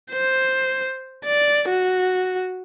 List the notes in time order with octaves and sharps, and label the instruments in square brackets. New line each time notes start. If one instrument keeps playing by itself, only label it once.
[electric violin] C5
D5
F#4